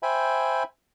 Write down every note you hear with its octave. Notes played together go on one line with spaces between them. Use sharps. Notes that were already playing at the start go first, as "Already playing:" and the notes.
C5 E5 G5 G#5 B5